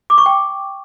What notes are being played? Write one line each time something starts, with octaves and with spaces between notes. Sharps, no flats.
D6
C#6
G5